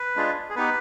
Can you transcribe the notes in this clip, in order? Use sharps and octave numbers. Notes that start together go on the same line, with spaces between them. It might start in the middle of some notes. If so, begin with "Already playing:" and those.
Already playing: B4
G#3 D4 F4 G#4
G#4
B3 D#4 G4 B4